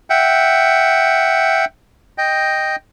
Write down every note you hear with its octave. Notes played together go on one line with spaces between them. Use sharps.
E5 F#5 G5
D#5 G5